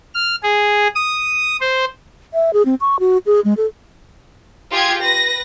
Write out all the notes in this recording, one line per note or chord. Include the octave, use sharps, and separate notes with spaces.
F6
G#4
D#6
C5
E5
G#4
C4
C#6
F#4
G#4
G#3
A4
F4 G4 G#4 G5 G#6
B4 A#6